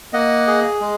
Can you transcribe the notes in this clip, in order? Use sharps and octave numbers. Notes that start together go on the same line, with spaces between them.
A#3 D#5 F#5
G#4
G#3